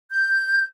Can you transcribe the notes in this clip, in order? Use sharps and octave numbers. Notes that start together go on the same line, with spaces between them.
G6